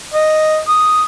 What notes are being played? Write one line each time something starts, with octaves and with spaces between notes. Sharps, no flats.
D#5
D#6